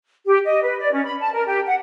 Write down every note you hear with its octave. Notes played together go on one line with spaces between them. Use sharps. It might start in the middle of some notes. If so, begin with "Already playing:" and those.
G4
D#5
B4
D5
C#4
B5
A5
A#4
G4
F#5